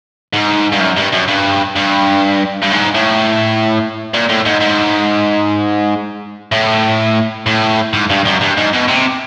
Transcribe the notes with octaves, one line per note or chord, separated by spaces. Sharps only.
G#2
G2
F#2
G2
F#2
G2
G2
G2
G#2
A2
A#2
A2
G#2
G#2
A2
A2
G#2
G2
F#2
G2
G#2
B2
C3